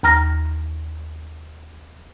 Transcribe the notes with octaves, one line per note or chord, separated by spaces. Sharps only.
D#2 A#5 F6 A#6